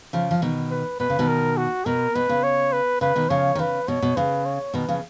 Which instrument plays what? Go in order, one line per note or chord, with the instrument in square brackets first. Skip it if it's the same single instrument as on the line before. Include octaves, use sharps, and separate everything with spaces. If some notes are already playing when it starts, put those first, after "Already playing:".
[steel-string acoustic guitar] C#3 F3
F3
B2 D#3
[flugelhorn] B4
[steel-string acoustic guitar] B2 [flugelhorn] B4
[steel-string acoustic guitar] C#3
B2 D#3
[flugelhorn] A#4
F#4
[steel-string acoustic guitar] B2 [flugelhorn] A#4
[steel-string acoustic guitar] B2 [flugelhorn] B4
[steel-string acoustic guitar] C#3
[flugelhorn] C#5
B4
[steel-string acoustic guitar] C#3 [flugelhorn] B4
[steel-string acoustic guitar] B2 D#3
[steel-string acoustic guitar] C#3 F3 [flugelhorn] C#5
[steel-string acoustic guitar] D#3
[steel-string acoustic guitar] C#3 [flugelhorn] B4
[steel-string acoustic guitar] B2 [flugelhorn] C#5
[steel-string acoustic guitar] B2
[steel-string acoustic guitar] C#3 [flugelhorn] B4
[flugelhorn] C#5
[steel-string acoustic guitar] B2 D#3 [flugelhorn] B4
[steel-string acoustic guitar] C#3 F3